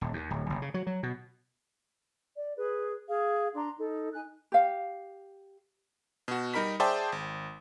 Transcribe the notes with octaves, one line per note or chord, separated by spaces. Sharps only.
D#1
D#2
D1
F#1
C#3
F#3
F#3
B2
D5
G#4 B4
G#4 F5
D4 A#5 C6
D#4 A4
D#4 G#5 F#6
G4 F5
B2 F#4
G3 D#4 A#4 B5 B6
G#4 C5 D5 E5 G5 A5
G#1